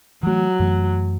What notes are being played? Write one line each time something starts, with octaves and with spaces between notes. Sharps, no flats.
E3 F#3 A3
F#2 E3 A3